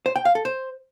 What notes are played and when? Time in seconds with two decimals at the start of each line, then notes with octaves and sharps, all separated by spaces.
0.06 C5
0.16 G5
0.25 F5
0.35 A4
0.45 C5